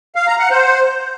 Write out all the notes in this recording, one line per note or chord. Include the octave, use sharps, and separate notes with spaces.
F5
A#5
F#5
C5